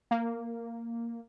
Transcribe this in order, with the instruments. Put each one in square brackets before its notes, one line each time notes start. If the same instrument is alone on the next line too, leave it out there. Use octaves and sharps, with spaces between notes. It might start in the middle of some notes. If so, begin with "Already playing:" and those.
[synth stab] A#3